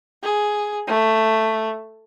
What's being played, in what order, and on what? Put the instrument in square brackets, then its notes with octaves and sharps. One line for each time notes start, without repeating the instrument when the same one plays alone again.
[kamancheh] G#4
A3